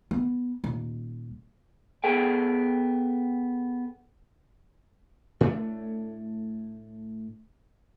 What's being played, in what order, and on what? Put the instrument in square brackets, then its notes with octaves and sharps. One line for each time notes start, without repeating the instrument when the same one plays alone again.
[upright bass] B3
D#1
[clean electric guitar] B3 G#4 A4 G5
[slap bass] A2 A3 D4